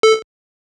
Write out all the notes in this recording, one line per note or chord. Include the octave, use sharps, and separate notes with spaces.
A4